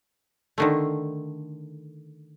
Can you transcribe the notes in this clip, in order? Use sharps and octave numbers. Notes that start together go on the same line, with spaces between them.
D3 D#3 A3